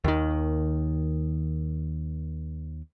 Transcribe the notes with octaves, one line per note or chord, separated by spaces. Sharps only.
D#2 D#3